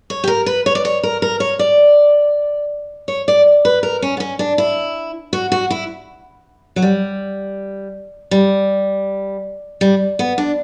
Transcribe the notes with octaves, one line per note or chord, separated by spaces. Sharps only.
C#5
G4
A#4
B4
C#5
D5
C#5
A#4
A#4
C#5
D5
C#5
D5
B4
A#4
C#4
B3
C#4
D4
E4
F#4
F#4
E4
F#3
G3
G3
G3
B3
D4